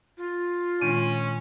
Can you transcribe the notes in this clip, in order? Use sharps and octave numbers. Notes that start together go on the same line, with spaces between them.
F4
A#2 D#3 G#3 C#4 D4 D7 D#7